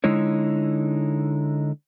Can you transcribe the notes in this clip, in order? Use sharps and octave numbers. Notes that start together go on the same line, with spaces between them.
D3 G#3 D#4 E4 C#5